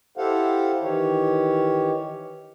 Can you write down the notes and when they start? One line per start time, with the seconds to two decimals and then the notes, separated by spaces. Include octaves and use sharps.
0.17 E4 G4 A4 C5 F5 F#5
0.82 D#3 E3 G4 C#5